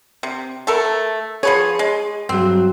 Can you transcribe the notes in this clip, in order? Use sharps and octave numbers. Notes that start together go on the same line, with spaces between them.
C3
A3 A4 A#4
F3 G#4 B4 C#5
G#3
G2 F#3 C4